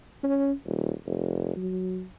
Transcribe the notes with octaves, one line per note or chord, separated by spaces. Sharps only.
C#4
D#1
F1
F#3